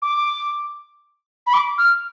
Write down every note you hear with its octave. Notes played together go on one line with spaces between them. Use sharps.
D6
B5
D6
F6